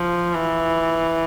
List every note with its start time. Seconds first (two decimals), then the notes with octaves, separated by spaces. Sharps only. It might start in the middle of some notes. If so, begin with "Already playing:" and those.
Already playing: F3
0.34 E3